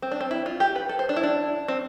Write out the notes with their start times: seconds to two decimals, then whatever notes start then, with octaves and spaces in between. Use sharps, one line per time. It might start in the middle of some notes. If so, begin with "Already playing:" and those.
0.02 C4
0.11 D4
0.21 C4
0.31 E4
0.46 F4
0.60 G4
0.76 B4
0.89 A4
0.99 C5
1.09 D4
1.16 E4
1.23 D4
1.68 C4